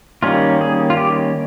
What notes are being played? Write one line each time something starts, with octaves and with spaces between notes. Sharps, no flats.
D#3 G3 A#3 C#4 F4
G#4
F4
G4